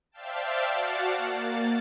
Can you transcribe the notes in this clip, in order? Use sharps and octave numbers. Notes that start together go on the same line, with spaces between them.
C5 D5 E5 F5 G5 A5
F#4 D5 F5 F#5 A5
A#3 A6